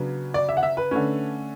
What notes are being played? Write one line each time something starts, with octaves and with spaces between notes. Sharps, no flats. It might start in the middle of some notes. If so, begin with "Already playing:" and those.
Already playing: C#3 F#3 B3 D4
D5
E5
F#5
E5
B4
D3 A3 C#4